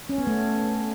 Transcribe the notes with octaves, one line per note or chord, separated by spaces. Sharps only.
C#4
B3
A3